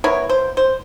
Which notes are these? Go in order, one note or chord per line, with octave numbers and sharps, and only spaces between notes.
B3 E4 A#4 C#5
C5
C5